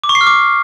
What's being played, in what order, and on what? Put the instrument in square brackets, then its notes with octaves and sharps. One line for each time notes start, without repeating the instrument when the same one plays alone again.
[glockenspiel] D6
C#6
C7
F6
D6